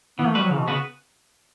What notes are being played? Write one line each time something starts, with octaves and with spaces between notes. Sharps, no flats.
E3 B3
A3
G3 B3 F#4 B4
F#3
C#3 E3
B2
C#3 B3 F#4 B4